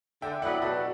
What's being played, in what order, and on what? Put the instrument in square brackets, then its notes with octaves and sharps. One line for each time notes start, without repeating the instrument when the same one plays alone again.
[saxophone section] D3 [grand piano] E5 G5
[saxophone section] F#3 B3 E4 B4 [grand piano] D5 F#5
[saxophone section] B2 [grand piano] F#4 A4